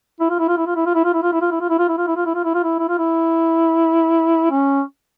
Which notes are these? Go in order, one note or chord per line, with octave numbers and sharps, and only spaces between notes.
E4
F4
E4
F4
E4
F4
E4
F4
E4
F4
E4
F4
E4
F4
E4
F4
E4
F4
E4
F4
E4
F4
E4
F4
E4
F4
E4
E4
F4
E4
C#4